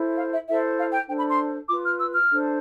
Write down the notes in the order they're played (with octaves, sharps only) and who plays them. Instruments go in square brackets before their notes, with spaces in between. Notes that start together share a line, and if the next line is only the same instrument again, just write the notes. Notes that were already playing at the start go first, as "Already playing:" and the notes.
Already playing: [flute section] E4 A4 C5
F5
E5
E4 A4 C5 E5
F5
G5
D4 A4 C5 G5
B5
C6
F4 D6
B4
F6
E6
F6
D4 A4 C5